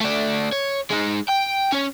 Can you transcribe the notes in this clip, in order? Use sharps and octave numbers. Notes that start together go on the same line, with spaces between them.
A3 D4
C#5
G#3 D#4
G5
C#4 C#5